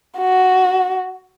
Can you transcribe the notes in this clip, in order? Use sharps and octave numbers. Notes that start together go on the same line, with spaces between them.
F#4